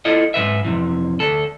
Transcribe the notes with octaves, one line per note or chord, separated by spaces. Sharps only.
E4 F4 A4 D#5
G#2 C#3 B4 E5
F2 C3 E3
D2 A4